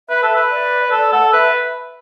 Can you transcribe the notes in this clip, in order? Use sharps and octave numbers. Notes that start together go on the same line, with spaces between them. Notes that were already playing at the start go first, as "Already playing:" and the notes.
B4 E5
A4
B4
D5
A4 D5
A4 F#5
B4 E5